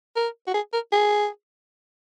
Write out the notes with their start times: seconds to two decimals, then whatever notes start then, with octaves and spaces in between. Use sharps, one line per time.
0.16 A#4
0.47 F#4
0.54 G#4
0.73 A#4
0.92 G#4